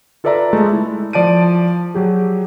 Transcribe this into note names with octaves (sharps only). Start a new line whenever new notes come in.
F4 A4 B4 D5 E5 A#5
G#3 A3 A5
E4
F3 D5 A5 D7 D#7
F#3 G4 G#4